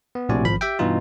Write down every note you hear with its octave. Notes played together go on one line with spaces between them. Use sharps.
B3
A#1 A2 C3 F#4 D5 G#5
G#1 F3 B5
G4 E5 G5
G2 B2 E3 D#4 F4